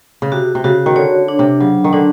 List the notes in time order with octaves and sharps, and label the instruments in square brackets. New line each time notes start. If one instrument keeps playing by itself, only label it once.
[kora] C#3
[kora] C3 [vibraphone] F#4
[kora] C3
[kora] C#3 [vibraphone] F#4
[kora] D#3
[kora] D3 [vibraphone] C#5
[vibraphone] D4
[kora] C3
[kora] C#3 [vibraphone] F#3
[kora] D#3
[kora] D3 [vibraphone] D4